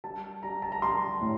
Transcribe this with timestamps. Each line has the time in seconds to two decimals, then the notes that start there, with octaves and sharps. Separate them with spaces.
0.04 G3 A5
0.43 G3 A#5
0.62 A5
0.72 A#5
0.82 G3 C6
1.21 A2